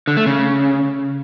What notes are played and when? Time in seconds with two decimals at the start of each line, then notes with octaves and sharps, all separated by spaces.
0.07 D3
0.17 A3
0.26 C#3